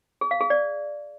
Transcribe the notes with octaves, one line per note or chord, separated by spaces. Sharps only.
G#4
F5
G#4
D5